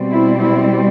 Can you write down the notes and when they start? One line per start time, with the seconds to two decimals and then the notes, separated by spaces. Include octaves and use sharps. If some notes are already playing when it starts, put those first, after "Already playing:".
Already playing: B2 G3 C4
0.10 E4
0.39 E4